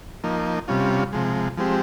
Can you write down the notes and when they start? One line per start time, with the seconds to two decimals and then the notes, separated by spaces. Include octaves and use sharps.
0.24 F3 A#3 D#4
0.68 C3 G3 C#4 F4
1.13 C3 F3 G#3
1.57 F3 G#3 C4 G4